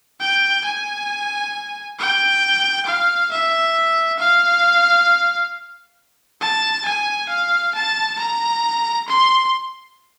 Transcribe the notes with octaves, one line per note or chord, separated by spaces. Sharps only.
G5
G#5
G5
F5
E5
F5
A5
G#5
F5
A5
A#5
C6